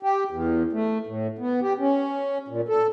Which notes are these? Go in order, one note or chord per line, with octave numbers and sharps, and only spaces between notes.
G4
E2
A3
A2
B3
G4
C#4
A#2
A4